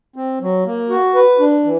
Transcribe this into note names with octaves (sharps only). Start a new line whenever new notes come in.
C4
F#3
A#3
F#4
B4
D4
E3